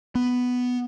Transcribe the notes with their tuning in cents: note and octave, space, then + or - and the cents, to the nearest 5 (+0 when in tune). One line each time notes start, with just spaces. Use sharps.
B3 +5